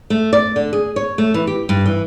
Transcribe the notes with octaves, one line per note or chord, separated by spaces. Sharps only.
A3
D5
D3
G#4
C#5
A3
E3
G4
G2
E3